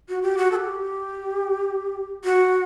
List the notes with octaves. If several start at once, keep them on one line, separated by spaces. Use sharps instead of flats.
F#4
G4
F#4
A4
G4
F#4